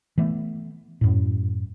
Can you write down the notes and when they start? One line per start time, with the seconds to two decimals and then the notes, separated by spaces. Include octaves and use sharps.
0.18 E3 A3 B3
1.01 F#2 A2